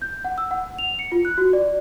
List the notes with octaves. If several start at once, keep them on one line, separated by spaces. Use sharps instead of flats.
G6
F#5
E6
F#5
F7
C#7
F4
F#6
F#4
D5